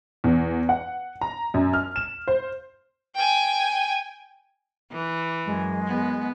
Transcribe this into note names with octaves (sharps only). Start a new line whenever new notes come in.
E2
F#5
A#5
F#2
F6
E7
C5
G5 G#5
E3
F#2 G#3
B3